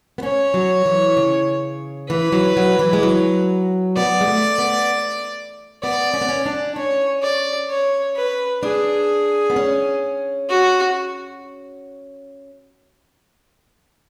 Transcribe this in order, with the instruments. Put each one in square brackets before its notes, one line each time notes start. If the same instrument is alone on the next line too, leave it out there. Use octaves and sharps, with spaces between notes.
[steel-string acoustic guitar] B3
[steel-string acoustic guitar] C#4 [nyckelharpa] C#5
[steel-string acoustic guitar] F#3
E3
C#3
[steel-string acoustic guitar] E3 [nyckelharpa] B4
[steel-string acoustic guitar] F#3
F#3
E3
G#3
F#3
[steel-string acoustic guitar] B3 [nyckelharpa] D5
[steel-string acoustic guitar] G#3
A3
B3
[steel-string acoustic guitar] B3 [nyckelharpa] D5
[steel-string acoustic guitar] C#4
B3
C#4
D4
[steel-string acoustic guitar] C#4 [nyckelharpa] C#5
[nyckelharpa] D5
C#5
B4
[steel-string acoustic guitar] D4 [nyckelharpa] G#4
[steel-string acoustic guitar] B3
C#4
[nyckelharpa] F#4